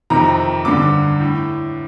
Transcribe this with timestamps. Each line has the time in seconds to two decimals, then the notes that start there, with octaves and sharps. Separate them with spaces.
0.10 F2 C3 D#3 A#5
0.65 G2 D3 D6
1.20 A2